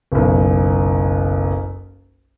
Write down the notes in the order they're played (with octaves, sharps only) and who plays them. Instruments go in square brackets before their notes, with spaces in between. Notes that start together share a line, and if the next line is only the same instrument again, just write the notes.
[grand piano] F#1 B1